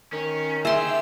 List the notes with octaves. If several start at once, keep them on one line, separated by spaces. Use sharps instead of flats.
D#3 C#4
F4 G4 G#4 E5 C6